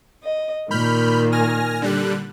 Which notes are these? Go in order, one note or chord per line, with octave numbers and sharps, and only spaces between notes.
D#5
A#2 D#3 B5 F6 G6
G#5 F6 A#6
D3 G3 F#6